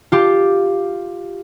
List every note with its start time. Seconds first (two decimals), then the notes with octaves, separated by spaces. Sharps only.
0.12 F4 G4